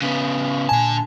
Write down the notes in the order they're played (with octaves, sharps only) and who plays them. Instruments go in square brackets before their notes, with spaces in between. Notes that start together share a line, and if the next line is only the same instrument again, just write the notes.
[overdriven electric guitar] C#3 B3
[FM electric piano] A#2 G#5 [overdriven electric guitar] D3 A5